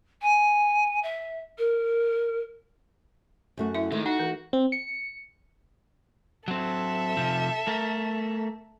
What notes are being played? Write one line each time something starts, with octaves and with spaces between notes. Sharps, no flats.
G#5
E5
A#4
F#2 A3 F#4
E4 E5
D#3 G#3 A3
D#4 F#4
E3
C4
C#7
F#3 C4 A4 E5
C3 F3
A3 A#4